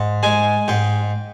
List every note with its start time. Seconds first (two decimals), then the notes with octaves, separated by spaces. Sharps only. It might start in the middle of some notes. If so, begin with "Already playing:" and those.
Already playing: G#2
0.23 G#3 G#5
0.68 G#2 G5